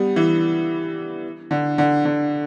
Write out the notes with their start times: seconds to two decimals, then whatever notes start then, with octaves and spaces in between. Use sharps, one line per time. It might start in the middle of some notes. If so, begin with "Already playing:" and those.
Already playing: G3 B3
0.16 E3
1.51 D3
1.78 D3
2.05 D3